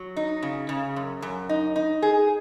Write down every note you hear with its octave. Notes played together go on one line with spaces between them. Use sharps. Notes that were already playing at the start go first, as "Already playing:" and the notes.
Already playing: F#3
D#4
C#3
C#3
F#2
F#2
D#4
D#4
G#4